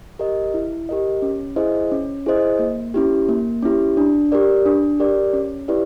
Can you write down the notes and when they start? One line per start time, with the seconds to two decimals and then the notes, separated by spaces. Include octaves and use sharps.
0.19 G4 A#4 D#5
0.54 E4
0.89 G4 A#4 D#5
1.22 C#4
1.56 E4 G#4 C5 D#5
1.91 C#4
2.26 E4 G#4 C5 D#5
2.59 A#3
2.94 C#4 E4 G4
3.29 A#3
3.62 C#4 E4 G4
3.97 D4
4.32 G4 A#4 D5
4.66 D4
5.00 G4 A#4 D5
5.33 C#4
5.68 E4 G4 B4 D5